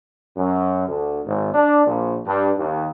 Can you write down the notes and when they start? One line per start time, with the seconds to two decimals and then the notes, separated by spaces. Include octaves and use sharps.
0.37 F#2
0.88 D2
1.25 G#1
1.54 D4
1.86 A#1
2.25 G2
2.58 D#2